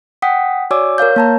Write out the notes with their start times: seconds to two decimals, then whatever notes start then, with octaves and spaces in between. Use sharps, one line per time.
0.22 F#5 G5 D#6 B6
0.71 F#4 C#5 D5 G#5 D6 E6
0.98 A#4 C#5 F5 G6
1.16 A#3 A5 A#5